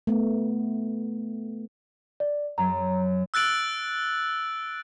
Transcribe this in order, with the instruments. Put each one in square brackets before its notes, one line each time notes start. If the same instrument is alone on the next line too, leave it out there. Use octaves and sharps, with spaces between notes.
[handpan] A3 B3
[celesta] D5
[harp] F#2 F#3 [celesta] A#5
[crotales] E6 F#6 A6 D7 F#7